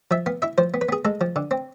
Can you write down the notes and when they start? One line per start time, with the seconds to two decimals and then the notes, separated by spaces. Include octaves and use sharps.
0.11 F3 E5
0.26 B3 F5
0.42 E4 E5
0.58 F3 C5
0.74 B3
0.81 B4
0.89 B3 G#4
1.05 G#3 A4
1.21 F3
1.36 D3
1.51 C4